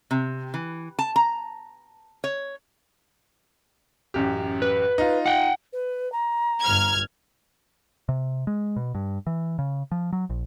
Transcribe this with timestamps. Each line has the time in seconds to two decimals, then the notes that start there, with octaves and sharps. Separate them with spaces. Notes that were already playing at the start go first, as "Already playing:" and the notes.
0.11 C3
0.54 E3
0.99 A5
1.16 A#5
2.24 C#5
4.14 A1 F#2 G4
4.62 B4
4.98 D#4 F4
5.26 F#5 G5
5.73 B4
6.12 A#5
6.62 G1 F6 G#6
8.09 C3
8.47 G#3
8.76 B2
8.95 G2
9.27 E3
9.59 C#3
9.92 F3
10.13 F#3
10.30 A#1